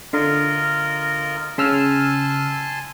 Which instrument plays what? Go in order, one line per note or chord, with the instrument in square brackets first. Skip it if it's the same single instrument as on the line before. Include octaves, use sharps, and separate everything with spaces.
[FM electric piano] D3 [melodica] F4 A#4 D#5
[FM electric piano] C#3 E6 F6 [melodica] G#5 A5 C6